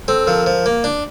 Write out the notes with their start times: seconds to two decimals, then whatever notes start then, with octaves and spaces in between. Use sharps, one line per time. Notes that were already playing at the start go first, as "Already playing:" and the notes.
0.08 C4 A4
0.27 F3 A#4
0.46 F3
0.66 A#3
0.84 D4